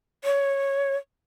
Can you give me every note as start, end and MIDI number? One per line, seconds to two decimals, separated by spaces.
0.24 0.96 73